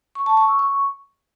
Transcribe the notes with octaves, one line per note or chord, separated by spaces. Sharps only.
C#6
A5
C#6
E6
C#6